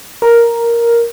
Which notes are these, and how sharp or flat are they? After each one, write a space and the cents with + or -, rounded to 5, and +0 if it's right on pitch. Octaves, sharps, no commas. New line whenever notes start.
A#4 +5